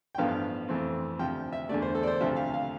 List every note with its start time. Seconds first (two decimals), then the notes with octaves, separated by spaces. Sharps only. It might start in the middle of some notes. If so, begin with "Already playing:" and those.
0.15 G5
0.18 A1 G2 F3 B3 F5
0.69 F2 E3 A3 C4
1.19 D2 C3 F3 G5
1.52 E5
1.69 E2 D3 A3 D5
1.82 C5
1.95 A4
2.03 D5
2.07 C5
2.21 D2 C3 F3 A3 E5
2.36 F5
2.54 F5